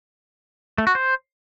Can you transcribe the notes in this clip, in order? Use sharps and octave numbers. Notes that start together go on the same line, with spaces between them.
A3
F#4
C5